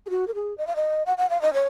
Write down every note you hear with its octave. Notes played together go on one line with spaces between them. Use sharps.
G#4
F#4
A#4
G#4
D#5
F5
D#5
F#5
F#5
F5
D#5
C#5